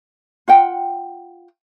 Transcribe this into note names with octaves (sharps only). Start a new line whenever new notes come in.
F4 F#5 G5